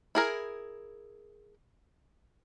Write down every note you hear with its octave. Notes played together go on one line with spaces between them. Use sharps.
E4 G#4 A#4